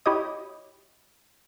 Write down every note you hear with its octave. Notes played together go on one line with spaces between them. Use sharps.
E4 F#4 G4 C#5 D#5 D#6